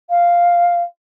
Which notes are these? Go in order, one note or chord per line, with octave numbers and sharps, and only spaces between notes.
F5